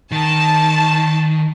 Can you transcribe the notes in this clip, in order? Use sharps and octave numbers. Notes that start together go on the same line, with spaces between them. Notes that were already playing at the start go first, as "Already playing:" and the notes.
D#3 A5